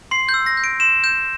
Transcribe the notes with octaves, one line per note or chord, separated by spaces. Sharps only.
C6 C7
G6
E6
A#6
G6
D7
C6 E7
G6 E7